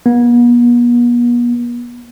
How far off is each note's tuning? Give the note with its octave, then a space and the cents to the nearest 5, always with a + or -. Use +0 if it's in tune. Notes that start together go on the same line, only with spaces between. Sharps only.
B3 -45